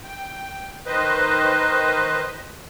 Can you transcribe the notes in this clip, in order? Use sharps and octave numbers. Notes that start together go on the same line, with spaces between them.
G5
D#3 B4 C5 D#5